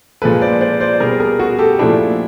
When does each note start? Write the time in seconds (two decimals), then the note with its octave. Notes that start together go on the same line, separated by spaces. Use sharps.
0.22 A#2 F3 G#3 A4 B4
0.41 C5 D5
0.61 C5 D5
0.80 C5 D5
1.00 B2 G3 G#4 A#4
1.20 G#4 A#4
1.39 F#4 G#4
1.59 G4 A4
1.79 A#2 F3 A3 D4 E4